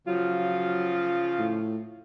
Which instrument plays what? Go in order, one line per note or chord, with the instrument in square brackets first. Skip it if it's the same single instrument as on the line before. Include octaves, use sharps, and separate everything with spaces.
[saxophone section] C#3 F3 F4 [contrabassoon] F#3
[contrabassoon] A2